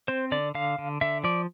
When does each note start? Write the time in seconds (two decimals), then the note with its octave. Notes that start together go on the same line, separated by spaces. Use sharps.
0.08 C4 C5
0.32 D3 D5
0.55 D3 F5
0.78 D3
1.01 D3 E5
1.24 F3 D5